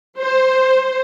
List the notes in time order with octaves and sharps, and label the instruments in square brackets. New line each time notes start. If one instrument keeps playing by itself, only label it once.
[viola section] C5